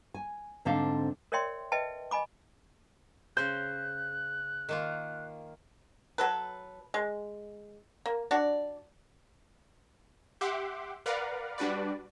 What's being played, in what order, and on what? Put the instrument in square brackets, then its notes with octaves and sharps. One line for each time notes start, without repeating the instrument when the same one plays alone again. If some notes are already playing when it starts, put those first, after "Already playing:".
[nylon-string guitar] G#5
G#2 D3 C4 D4 F5
[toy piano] A#4 C#5 D5 E5 G5 C6
B4 D#5 E5 G5 A5
D#5 G#5 B5 D6
[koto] C#3 C5 [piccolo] F#6 [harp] G6
[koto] D#3 A#3 F4
[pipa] F#3 A4 B4
G#3
A#3
D4 F#4 D5
[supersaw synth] G4 E5 F#5 C6 D6
A#4 B4 D5 F5 F#5
G3 D4 F#4 B4 D5